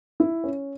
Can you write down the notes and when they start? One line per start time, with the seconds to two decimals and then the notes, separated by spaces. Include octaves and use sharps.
0.20 E4
0.44 C#4